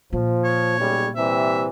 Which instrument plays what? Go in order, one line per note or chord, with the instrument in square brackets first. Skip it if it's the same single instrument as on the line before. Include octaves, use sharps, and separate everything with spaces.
[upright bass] A#2 [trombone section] F3
[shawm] C#5
[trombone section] B1 C#3 G3
[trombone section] C3 E3 G3 [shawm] E5